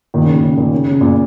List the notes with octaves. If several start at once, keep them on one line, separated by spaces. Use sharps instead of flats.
A#2 D#3
C#3
A#2
C#3
A#2 D#3
C#3
C#3
A#2